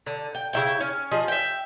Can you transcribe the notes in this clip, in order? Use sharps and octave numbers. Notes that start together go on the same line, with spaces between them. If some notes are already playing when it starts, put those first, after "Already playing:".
D3
G5
C#3 E4 G5
C#4
F3 G#4 D#5
E5 G5